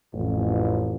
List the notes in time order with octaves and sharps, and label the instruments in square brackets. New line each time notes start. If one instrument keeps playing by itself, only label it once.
[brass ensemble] A1 F2